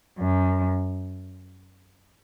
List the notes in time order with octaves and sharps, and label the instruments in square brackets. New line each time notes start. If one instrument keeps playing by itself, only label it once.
[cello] F#2